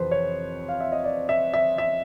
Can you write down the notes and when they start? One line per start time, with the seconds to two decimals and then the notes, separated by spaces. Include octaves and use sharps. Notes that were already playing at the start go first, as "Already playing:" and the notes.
Already playing: F2 C3 E3 B4 C5
0.11 C#5
0.69 F5
0.81 E5
0.92 D#5
1.04 D5
1.29 E5
1.54 E5
1.78 E5